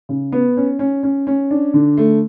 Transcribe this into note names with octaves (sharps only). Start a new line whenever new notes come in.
C#3
B3
C#4
C#4
C#4
C#4
D4
D3
A3